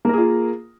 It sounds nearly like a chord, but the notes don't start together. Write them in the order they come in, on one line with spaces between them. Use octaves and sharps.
A#3 A#4 G#4 F4